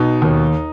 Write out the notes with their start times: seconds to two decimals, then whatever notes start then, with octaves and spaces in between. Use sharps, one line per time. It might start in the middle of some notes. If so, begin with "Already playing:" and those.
Already playing: B2 D#4
0.22 D#2